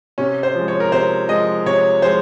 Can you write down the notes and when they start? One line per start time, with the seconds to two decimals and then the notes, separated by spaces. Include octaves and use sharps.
0.18 C3 C#4
0.43 C5
0.55 F3 G#3
0.68 C#5
0.80 A#4
0.92 C3 C5
1.28 F3 G#3 D#5
1.66 C3 C#5
2.02 F3 G#3 C5